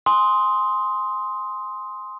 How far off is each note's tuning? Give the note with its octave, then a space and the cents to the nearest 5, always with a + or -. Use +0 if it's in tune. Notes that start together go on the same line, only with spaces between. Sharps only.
G#5 +0 C6 +0 D#6 +15